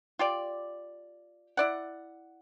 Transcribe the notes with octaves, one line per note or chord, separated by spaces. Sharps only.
F4 G4 D5
E4 D5 F#5